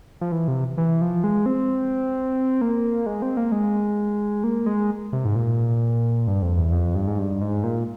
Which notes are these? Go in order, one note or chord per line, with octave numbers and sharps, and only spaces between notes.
F3
E3
C3
E3
F3
G#3
C4
A#3
G#3
C4
A#3
G#3
A#3
G#3
C3
G#2
A#2
G2
F2
E2
F2
G2
G#2
G2
G#2
A#2